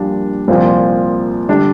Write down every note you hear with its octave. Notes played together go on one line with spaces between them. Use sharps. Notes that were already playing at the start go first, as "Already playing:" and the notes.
Already playing: A#1 A#2 G3 D4
C2 A#2 F3 C4
D3 G3 D4